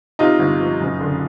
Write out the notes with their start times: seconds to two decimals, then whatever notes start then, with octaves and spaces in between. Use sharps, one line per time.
0.19 C3 D#4 F4
0.39 G1
0.60 F3
0.81 F#1
1.01 D3